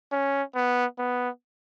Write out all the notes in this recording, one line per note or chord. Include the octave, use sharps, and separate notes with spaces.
C#4
B3
B3